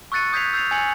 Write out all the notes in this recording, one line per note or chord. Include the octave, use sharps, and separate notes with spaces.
C#6 E6 F#6 A6 C#7 D#7
D#6 G6 G#6 B6 C7 F7
E6 G6 A6 C7 F7
G#5 E6 G#6 C#7 F#7